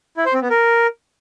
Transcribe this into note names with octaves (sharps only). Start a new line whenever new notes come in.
E4
C5
C4
B3
A#4